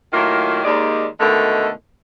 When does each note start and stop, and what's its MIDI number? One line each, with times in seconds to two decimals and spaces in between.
0.13 0.60 45
0.13 0.60 51
0.13 0.60 54
0.13 0.60 58
0.13 0.60 64
0.13 0.60 65
0.64 1.05 39
0.64 1.05 56
0.64 1.05 74
1.20 1.69 47
1.20 1.69 50
1.20 1.69 51
1.20 1.69 56
1.20 1.69 57